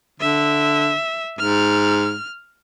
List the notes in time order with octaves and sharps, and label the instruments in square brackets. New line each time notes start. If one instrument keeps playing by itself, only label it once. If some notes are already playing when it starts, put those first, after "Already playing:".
[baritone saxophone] D3 [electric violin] E5
[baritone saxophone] G#2 [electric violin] F6